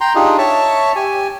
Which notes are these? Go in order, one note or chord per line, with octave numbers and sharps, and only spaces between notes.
G5 A#5 C6
D4 D#4 F4 G4 G#4
C#5 E5 A5 C#6
G4 G#5